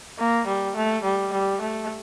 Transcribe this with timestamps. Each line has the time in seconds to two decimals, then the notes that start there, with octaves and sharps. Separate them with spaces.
0.19 A#3
0.47 G3
0.76 A3
1.04 G3
1.33 G3
1.61 A3